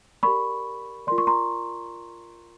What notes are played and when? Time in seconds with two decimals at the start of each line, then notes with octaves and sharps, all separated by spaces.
0.23 G4 A#4 D5 B5 C#6
1.07 F4 A#4 D5 C6
1.18 C#6
1.27 A#5 C6